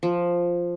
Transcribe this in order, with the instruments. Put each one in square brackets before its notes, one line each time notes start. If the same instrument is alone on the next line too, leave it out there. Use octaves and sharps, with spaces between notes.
[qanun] F3